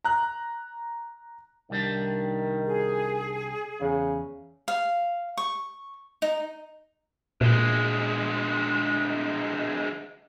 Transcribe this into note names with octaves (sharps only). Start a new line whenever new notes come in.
A#5 F#6
C2 D#3 G3 D4
G#4
E2 C#3
F5
C#6
D#4
D2 A#2 G#3